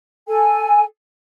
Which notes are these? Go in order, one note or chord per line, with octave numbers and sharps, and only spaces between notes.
A4 G#5